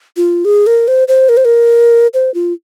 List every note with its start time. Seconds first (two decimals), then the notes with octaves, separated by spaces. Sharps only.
0.17 F4
0.45 G#4
0.67 A#4
0.88 C5
1.08 C5
1.29 A#4
1.37 C5
1.45 A#4
2.14 C5
2.34 F4